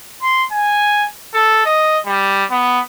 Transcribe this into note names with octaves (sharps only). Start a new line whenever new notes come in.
C6
G#5
A4
D#5
G3
B3